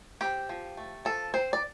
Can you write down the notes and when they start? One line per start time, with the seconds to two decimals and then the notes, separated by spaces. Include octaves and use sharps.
0.21 C4 G4
0.49 F3
0.77 A3
1.05 F3 A4
1.34 C4 C5
1.53 D5